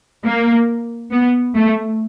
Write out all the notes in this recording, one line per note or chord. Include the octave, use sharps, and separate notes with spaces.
A#3
B3
A3